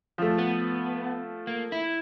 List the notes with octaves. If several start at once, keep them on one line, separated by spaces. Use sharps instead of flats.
F3 A3
B3
A#3
E4